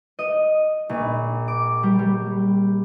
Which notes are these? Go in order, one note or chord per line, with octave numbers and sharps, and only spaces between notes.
D#5
A#1
D6
G3
G3